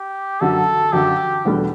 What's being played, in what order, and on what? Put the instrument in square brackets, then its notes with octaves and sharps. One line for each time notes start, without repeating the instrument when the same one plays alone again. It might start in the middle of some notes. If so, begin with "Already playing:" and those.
Already playing: [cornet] G4
[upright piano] F#2 D3 F#3 [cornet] A4
[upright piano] F#2 D3 F#3 [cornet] G4
[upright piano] E2 B2 G3 D4 A4